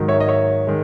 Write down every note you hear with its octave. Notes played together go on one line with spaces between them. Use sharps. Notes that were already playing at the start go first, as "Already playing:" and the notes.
Already playing: G#2 D#3 F#3
C#5 E5
D#5
C#5 E5
D#3 G#3